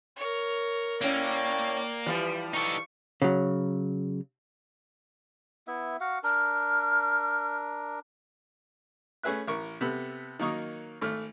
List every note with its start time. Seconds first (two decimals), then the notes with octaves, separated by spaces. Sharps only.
0.16 A#4 C#5
1.01 A2 A#3 C#4 D5 G5
2.06 E3 F3 G3
2.54 D#4 A4 C#6
3.22 C#3 F#3
5.67 B3 E4 E5
6.00 F#4 F5 F#5
6.23 D4 A#4 F6
9.23 A3 C#4 G#4 B4 E5 F#6
9.48 A1 A#4 C#6
9.81 C3 B3 A4 B5
10.39 D#3 F#3 A#3 D#4 C#6 D#6
11.01 G#1 A3 F6